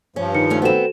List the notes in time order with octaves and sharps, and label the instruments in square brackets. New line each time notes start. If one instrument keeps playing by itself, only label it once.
[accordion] G2 F3 [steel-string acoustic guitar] C#4
[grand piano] D#3 [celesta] C#7
[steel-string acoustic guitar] A3 C#4
[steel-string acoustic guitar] B3 C4 [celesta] F#4 A4 E7